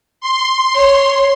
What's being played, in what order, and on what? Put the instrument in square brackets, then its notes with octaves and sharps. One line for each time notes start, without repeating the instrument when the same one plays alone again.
[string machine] C6
[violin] C#5